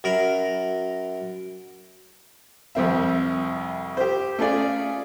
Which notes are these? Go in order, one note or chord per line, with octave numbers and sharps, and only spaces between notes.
F#2 A#4 B5
C2 F2 C4 E5
G4 C5
A3 C#4 F4 G#4 D5